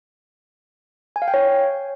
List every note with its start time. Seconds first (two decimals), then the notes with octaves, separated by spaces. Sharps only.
1.16 G#5
1.22 F5
1.28 G5
1.34 C#5